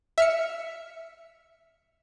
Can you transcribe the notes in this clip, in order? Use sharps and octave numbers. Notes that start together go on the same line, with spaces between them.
E5 F6 C#7